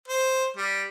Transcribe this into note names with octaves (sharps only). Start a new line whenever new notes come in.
C5
G3